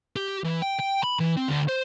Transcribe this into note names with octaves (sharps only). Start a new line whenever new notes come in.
G4
E3
G5
G5
B5
E3
C4
D2
C5